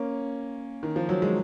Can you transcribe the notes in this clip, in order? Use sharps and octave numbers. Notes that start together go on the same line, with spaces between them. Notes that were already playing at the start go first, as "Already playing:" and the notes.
Already playing: A#3 C#4
D#3
F3
F#3
G#3